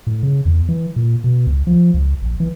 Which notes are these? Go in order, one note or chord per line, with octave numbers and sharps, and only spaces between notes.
A2
C#3
E2
E3
A#2
B2
C#2
F3
C#2
A#1
E3